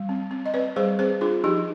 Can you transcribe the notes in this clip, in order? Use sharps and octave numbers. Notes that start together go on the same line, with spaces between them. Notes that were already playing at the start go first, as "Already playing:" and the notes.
Already playing: G3
C4
C4
D#5
C4 B4 D5
G3 G#4 C5
C4 G#4 C5
D4 F4 G#4
F3 D#4 G4